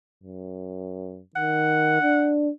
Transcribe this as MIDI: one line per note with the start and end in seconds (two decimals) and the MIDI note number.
0.23 1.21 42
1.36 2.02 51
1.36 2.32 78
2.02 2.50 62